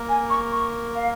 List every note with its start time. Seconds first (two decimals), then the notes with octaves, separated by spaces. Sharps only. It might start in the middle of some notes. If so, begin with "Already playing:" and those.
Already playing: A#3 A#4
0.08 G#5
0.29 C#6
0.52 C#6
0.94 F5